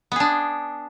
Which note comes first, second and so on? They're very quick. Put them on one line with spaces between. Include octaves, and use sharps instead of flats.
B3 G#4 D4